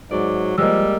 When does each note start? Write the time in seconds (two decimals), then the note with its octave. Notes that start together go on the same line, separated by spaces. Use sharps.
0.11 G#2 F#3 D5
0.58 F3 G3 G#3 A#3 D#5 E6